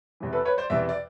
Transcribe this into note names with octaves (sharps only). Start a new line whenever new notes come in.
E2 C3 E3
A4 B4
B4 C#5
C5 D5
E2 C3 E3 D5 E5
D5